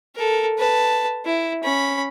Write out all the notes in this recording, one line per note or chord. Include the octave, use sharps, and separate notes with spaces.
A4 A#4
B4 A5
E4
C#4 B5